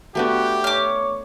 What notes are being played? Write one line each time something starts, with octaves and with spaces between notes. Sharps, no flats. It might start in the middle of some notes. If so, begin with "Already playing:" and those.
A3 B3 D4 F#4 G4
C#5 D6 F6